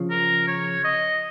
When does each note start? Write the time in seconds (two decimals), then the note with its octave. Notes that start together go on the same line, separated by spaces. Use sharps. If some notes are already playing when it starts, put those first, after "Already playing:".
Already playing: C#3 F3
0.10 A#4
0.48 C#5
0.84 D#5